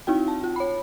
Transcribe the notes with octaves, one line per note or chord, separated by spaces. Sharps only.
C4 D#4 E4 F#4 G5
A5
F4
C#5 B5